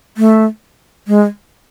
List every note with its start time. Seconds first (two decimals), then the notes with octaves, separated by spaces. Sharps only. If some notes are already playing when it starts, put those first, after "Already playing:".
0.17 A3
1.08 G#3